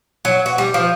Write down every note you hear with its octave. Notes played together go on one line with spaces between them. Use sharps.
F#3
F#4
G3
F3